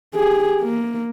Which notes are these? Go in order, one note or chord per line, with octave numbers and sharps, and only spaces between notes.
G4 G#4
A#3